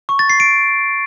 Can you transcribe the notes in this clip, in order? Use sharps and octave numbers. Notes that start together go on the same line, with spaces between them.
C#6
A6
C7
D7